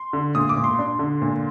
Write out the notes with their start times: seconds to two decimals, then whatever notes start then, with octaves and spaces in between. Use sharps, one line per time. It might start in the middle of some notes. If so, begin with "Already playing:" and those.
Already playing: C6
0.13 D3
0.35 A#2 D#6
0.49 D6
0.57 A#2
0.64 C6
0.79 D4
0.99 D3
1.22 A#2